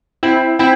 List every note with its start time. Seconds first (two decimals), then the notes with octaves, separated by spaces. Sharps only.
0.23 C4 E4
0.59 C4 E4